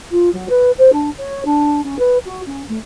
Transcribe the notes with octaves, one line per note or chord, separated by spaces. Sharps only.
F4
F#3
B4
C5
D4
C#5
D4
C#4
B4
F#4
C#4
A3